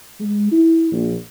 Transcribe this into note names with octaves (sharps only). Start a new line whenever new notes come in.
G#3
E4
A#1